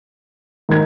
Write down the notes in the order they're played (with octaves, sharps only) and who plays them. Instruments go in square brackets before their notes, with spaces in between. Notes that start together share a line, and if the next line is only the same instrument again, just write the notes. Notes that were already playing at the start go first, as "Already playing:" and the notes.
[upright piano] G#2 A#4 G#6 [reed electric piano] D#3